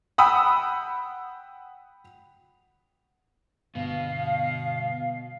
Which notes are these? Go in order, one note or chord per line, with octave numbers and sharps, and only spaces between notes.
F#5 G5 B5 D#6 E6
G1 B2 F5